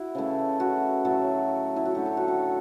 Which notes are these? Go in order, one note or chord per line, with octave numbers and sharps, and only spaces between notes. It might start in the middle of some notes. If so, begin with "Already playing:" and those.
Already playing: E4 F#4
C#3 E3 A3
F#4
A2 F#3 A3
E4
F#4
D3 F#3 A3 G4
A4
F#4
F#4